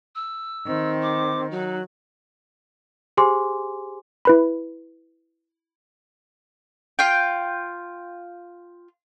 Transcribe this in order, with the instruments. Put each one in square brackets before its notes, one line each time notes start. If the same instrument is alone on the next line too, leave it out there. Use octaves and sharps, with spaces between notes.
[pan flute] E6
[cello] D#3 [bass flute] C4
[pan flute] D6
[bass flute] F#3 [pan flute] D#4
[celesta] G4 G#4 C5 G#5 C6 D6
[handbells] E4 B4 B5
[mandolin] F4 G5